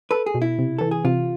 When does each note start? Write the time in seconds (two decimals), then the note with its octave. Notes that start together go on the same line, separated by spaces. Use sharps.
0.11 A4 B4
0.26 G#4
0.34 B2
0.42 E4
0.58 C3
0.78 E3 A4
0.91 G#4
1.05 C3 F4